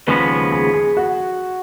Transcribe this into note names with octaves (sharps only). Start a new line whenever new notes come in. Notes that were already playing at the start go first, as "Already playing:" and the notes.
D#2 C#3 F3 G#3 B3 B4
G#4
G#4
F#4